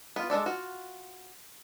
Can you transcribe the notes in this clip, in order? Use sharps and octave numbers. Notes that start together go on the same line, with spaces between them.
B3 F4
G#3 D4 A4 D5
F4 F#4